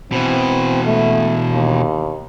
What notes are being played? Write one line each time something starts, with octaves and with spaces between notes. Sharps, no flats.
B2 E3 C4
A3
D#2